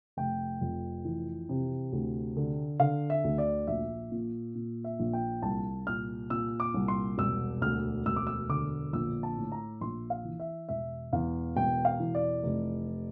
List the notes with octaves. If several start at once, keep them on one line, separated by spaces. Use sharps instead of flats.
F1 G5
F2
E3
C3
D2
D3
D3 F5
E5
D2
D5
A#1 E5
A#2
A#2
E5
A#1
G5
C2 A5
A#2 F6
A#2 E6
D6
C2
C6
E1 E6
D2 F6
E1 E6
D6
E6
D3 D6
A#1 E6
A5
A2
A#5
A#1 C6
F5
E3
E5
E1 E5
E2 F5
E1 G5
F5
E3
D5
F1